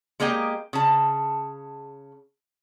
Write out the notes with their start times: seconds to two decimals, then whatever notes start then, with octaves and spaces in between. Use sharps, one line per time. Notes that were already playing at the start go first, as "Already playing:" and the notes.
0.20 G#3 A#3 G4 D#5 G5
0.73 C#3 A5